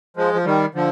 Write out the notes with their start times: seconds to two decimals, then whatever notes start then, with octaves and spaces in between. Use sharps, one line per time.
0.17 F3 G#3
0.34 F3
0.45 D#3 G3
0.74 D3 F3